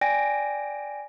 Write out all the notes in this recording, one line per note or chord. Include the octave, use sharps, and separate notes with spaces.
D5 G5 G#5 A#6 D7